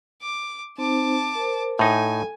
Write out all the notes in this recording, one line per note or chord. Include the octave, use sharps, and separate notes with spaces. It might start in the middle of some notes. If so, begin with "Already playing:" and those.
D6
C4 D#4 C5 A5 D6
A#4 C5
A2 D#4 A4 G#5